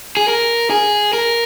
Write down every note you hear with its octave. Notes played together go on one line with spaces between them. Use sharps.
G#4
A#4
G#4
A#4